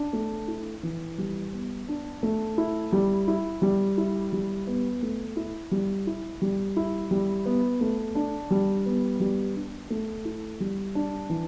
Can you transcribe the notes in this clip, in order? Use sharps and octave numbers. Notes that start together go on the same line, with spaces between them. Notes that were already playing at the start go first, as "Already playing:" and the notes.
Already playing: D4
A3
E4
E3
G3
B3
D4
A3
E4
G3
E4
G3
E4
G3
B3
A3
E4
G3
E4
G3
E4
G3
B3
A3
D4
G3
B3
G3
D4
A3
E4
G3
D4
E3